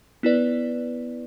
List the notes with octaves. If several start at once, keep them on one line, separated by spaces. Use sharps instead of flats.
B3 E4 B4 D5